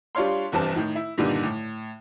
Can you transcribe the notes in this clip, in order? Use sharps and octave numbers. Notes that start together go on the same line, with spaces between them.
G3 D4 F4 C#5 F5 C6
F1 E2 G2 C4 A5
A2 D#3
E4
G2 A#2 D3 D#3 G3
A2